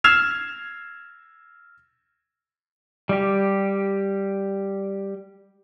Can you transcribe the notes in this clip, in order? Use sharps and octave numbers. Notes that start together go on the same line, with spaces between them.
E6 F6 G#6 C7 E7 F7
G3 G4